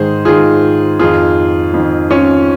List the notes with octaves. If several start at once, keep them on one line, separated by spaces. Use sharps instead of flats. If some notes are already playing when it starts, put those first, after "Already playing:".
Already playing: G#2 D#3 G#4 C5
G#2 D#3 F4 G#4
F2 D#3 F4 G#4
F2 D#3
C#4 F4